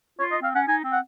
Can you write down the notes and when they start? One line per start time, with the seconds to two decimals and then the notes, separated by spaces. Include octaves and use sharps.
0.19 F4 C#5
0.32 D#5
0.42 C4 F5
0.55 C#4 F#5
0.68 D#4 G#5
0.84 C4
0.92 F#5